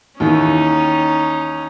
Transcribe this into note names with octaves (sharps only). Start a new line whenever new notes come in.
D#2 D#3 E3 C#4 D#4